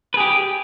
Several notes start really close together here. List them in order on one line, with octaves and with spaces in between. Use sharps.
B4 G#4 G4